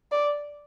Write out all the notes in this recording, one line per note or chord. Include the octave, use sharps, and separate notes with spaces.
D5